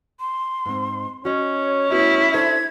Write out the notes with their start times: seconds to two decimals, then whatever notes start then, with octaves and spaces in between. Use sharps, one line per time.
0.20 C6
0.66 G#2 C4
1.25 C#4 F#4 C#5 D#5
1.91 A3 B3 E4 F#4
2.34 D4 A4 C5 G#6